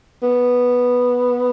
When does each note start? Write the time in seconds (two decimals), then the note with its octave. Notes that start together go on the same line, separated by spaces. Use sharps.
0.22 B3